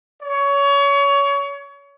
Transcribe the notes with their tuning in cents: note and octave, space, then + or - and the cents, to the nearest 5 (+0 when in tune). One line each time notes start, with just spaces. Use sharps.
C#5 +25